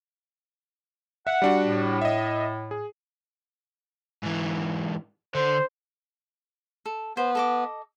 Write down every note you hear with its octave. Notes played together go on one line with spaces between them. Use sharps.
E5 F#5
G3 D4 F#4
A2
D#5 E5
G#4
G#2 E3
D3 C5
A4
B3 C5
A4 D#5 D6